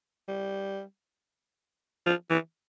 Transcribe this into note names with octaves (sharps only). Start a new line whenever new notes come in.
G3
F3
E3